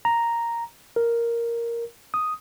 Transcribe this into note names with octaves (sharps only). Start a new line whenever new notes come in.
A#5
A#4
D#6